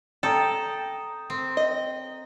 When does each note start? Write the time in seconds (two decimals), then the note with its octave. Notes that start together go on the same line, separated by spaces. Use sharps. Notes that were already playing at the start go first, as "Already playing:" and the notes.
0.23 A4 G5 A#5 D#6
1.30 C4
1.57 D#5